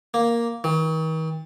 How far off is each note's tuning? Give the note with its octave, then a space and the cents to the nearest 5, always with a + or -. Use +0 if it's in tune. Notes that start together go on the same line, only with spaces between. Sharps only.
A#3 +5
D#3 +40